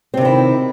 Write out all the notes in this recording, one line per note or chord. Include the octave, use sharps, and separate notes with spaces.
C3 D#3 C4 E4